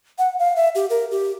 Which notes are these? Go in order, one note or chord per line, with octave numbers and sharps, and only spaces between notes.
F#5
F5
E5
G4
A#4
G4